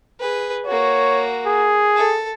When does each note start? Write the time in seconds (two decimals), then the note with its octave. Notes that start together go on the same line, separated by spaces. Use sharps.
0.20 G#4 B4
0.66 A#3 F#4 C#5
1.47 G#4
1.96 A4